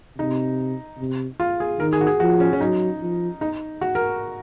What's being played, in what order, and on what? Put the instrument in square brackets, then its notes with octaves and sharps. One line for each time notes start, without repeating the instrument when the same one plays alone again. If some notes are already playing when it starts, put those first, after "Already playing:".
[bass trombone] C3 [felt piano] D#4
[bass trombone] C3
[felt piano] F4
G#4
[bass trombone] D#3 [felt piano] A#4
[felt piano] G#4
F#4
G#4
[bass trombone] F3 [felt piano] F#4
[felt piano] C#4
C#4
[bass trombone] F#3 [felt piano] D#4
[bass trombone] F3
[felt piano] D#4
F#4
A#4